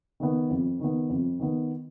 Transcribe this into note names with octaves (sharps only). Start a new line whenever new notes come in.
D#3 B3
F2
D#3 B3
F2
D#3 B3